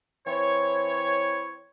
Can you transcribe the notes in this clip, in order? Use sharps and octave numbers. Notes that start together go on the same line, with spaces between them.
E3 C4 E4 C#5